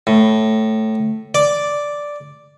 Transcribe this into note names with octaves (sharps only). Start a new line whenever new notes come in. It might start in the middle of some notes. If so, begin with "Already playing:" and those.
A2
D5